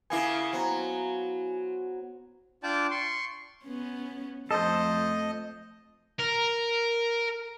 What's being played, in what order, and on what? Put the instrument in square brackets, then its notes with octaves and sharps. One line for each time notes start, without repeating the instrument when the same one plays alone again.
[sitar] C#3 A#3 B3 [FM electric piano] E4 F5 G#5
[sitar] F#3 [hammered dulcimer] B3 C5 A#5
[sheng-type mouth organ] D4 F4 D5 G5 A5 D6
C6 C#6
[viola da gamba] B3 C#4
[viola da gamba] F2 F3 A3 [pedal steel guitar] A4 C5 [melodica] D#5
[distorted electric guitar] A#4